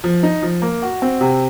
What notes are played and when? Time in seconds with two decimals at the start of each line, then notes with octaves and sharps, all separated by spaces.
0.04 F3
0.23 D#4
0.42 F3
0.62 A#3
0.82 F#4
1.02 C4
1.21 C3